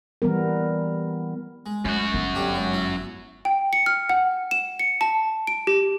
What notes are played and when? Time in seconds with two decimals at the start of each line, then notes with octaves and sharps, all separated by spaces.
0.22 E3 G3 B3 A#4
1.66 G#3
1.85 F#2 A3 F#4
2.14 G1 B3
2.35 D3 C4 G4
2.55 G#2 F#3
2.74 E4
3.45 G5
3.73 C#7
3.86 F6
4.09 F#5
4.51 E7
4.79 C#7
5.01 A5
5.47 D7
5.67 G4